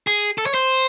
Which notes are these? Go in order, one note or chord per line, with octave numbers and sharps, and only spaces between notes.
G#4
A4
C#5
C5